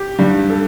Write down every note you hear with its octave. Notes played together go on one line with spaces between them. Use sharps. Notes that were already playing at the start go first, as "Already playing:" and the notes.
Already playing: G4
G2 G3
A4